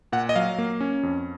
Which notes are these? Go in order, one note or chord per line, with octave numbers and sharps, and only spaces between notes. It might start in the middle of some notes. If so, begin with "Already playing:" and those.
A#2 F#5
D#5
F#3 F5
A#3
C#4
F2